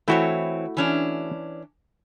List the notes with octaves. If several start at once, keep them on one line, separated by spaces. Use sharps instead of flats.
E3 A3 C4 E4 F#4 C#5
E3 C#4 D4